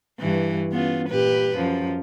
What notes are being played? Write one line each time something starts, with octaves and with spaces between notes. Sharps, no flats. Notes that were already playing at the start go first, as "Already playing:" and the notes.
G2 E3
B3 C#4 F4
A#2 G4 B4
F#2 F3